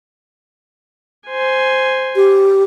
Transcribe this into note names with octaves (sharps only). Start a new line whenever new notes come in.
C5 G#5
G4